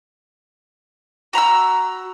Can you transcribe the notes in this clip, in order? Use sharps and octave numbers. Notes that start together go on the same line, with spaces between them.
F#4 A#5 B5 E6